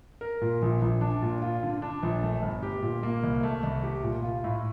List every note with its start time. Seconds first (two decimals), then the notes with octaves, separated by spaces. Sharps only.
0.21 A#4
0.41 A#2
0.62 A#1
0.82 A#1
1.01 D4
1.22 A#2
1.42 F4
1.63 D3
1.82 D4
2.03 A#1
2.23 A3
2.42 G1
2.63 G4
2.82 A#2
3.03 A#3
3.23 C2
3.43 A3
3.63 C2
3.84 G4
4.03 A#2
4.23 F4
4.44 A2